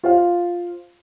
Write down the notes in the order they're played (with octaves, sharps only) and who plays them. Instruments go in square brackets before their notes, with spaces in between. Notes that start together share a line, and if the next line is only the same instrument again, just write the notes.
[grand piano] F4 C5 F5